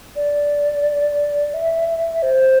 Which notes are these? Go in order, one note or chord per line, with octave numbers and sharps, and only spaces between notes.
D5
E5
C5